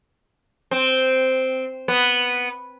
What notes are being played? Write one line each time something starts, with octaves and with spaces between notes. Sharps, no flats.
C4
B3